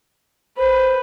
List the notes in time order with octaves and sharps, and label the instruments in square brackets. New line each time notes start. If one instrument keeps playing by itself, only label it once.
[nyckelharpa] B4 [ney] C5